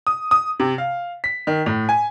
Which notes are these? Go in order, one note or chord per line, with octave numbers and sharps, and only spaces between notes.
D#6
D#6
C3
F5
B6
D#3
A2
G#5